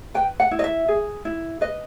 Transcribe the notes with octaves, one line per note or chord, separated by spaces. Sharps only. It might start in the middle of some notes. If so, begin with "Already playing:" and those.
B4 G5
F#5
E4
D#5
E5
G#4
E4
B4 D#5